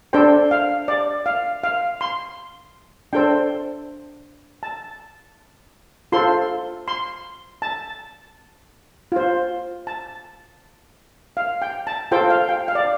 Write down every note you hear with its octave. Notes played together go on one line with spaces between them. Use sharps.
D4 A4 C5 G5
F5
D5
F5
F5
C6
D4 A4 C5 G5
A5
F4 A4 C5 C6
C6
A5
F4 C5
A5
F5
G5
A5
F4 A4 C5 G5
F5
G5
F5
D5